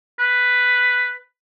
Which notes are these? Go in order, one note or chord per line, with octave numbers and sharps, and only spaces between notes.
B4